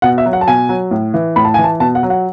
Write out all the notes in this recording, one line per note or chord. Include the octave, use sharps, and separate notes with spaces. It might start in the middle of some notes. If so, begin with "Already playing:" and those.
B2 F#5
E5
F#3
F#5
A5
B2 G#5
F#3
A2
E3
A2 B5
A5
G#5
E3
A5
B2 A5
F#5
F#3
F#5